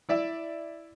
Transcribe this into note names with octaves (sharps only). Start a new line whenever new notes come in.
E4 D5 E5